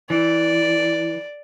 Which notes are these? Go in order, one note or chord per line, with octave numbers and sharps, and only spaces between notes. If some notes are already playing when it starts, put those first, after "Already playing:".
E3 D5